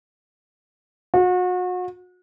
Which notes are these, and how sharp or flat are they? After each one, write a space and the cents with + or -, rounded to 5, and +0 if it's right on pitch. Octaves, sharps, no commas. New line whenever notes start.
F#4 -35